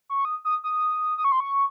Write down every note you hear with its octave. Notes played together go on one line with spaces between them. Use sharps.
C#6
D#6
D#6
D#6
D#6
C#6
C6
C#6